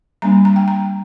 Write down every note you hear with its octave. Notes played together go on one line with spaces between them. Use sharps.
G3 A#3 D4 A#5
A#5
G5
A#5